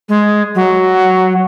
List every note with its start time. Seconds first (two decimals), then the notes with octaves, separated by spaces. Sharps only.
0.09 G#3
0.55 F#3